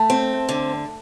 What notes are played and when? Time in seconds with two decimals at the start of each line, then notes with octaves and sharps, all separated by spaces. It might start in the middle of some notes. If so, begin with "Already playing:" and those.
Already playing: A3
0.10 C4
0.49 D3